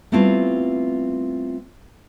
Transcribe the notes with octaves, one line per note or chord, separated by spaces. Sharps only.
G3 A3 B3 C4 E4 F4